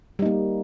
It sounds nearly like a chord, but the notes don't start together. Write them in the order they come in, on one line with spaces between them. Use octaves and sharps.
G3 D#4 A#3